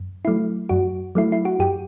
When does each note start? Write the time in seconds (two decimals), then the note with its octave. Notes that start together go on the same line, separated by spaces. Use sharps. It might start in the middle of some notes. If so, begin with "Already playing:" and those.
Already playing: F#2
0.25 F#3 A3 E4
0.69 F#2 F#4
1.15 F#3 A3 E4
1.32 E4
1.45 F#4
1.59 F#2 G4